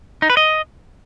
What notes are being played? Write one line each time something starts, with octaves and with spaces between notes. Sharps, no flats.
D#4
B4
D#5